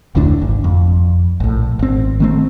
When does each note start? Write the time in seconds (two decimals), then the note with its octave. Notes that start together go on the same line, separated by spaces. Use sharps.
0.15 F1 D2 A2 D4
0.42 G#1
0.64 F2
1.40 A#1 A2
1.79 G#1 C4
2.20 D#3 A3 C4